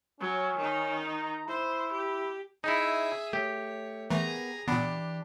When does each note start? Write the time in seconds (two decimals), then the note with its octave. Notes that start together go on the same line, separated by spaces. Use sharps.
0.20 F#3 C#4
0.58 D#3 D#4
1.11 A#5
1.48 E4 C5
1.92 G4
2.64 D#4 E4 G#4 E5
3.33 A3 G4 C#5
4.10 E3 A3 B3 G#4 A#4 A#5
4.68 A#2 E3 B3 D4 G4 B5